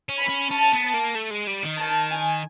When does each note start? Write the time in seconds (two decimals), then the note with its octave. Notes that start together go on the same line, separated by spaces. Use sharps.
0.09 C#4
0.19 B5
0.29 C#4
0.51 C#4 A5
0.73 B3
0.94 A#3
1.15 A3
1.31 G#3
1.47 G3
1.63 D#3
1.78 A5
2.10 G#5